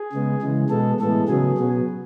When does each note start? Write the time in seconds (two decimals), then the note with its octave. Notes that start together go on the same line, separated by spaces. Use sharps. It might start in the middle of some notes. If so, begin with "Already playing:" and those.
Already playing: G#4
0.12 C#3 G#3 B3
0.42 C#3 E3 G#3
0.70 B2 G#3 B3 A4
1.00 A2 E3 G#3 B3 A4
1.28 C#3 F#3 B3 G#4
1.58 B2 F#3 B3